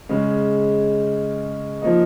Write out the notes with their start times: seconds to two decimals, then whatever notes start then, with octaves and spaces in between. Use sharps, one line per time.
0.09 C#3 G#3 C#4
1.82 F3 A#3 D#4